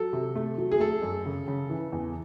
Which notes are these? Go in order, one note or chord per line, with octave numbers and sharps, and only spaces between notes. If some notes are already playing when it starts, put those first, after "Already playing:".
Already playing: F#3 A4
C3
A3
F#3
G#4
A3 A4
F#2
C#3
C#3
E3
E2